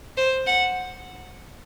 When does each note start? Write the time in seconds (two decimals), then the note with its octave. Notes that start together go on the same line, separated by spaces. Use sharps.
0.17 C5
0.47 F#5